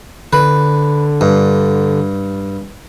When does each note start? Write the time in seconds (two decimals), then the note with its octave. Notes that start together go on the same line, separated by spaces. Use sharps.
0.33 D3 B4
1.21 G2